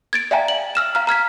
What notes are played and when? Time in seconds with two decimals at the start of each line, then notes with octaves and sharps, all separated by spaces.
0.13 G#6 A6 D7
0.31 D5 E5 F5 G5 G#5 A#5
0.48 F#7
0.75 E6 F6 E7
0.95 F5 A#5 F6
1.07 A#5 F6 G#6 B6